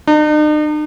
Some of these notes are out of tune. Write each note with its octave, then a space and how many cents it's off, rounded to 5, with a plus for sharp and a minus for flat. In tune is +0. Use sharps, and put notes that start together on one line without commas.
D#4 -45